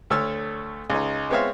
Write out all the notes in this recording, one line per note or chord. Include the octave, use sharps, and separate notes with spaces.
D2 A3 A4 C#5 E6 F6
C#2 C#4 D#4
G#3 B3 C4 C#5 E5 F5